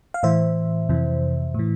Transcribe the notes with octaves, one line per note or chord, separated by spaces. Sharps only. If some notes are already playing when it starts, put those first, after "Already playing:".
F5
A2 E3 C5 E5
F2 C3 E3
A2 E3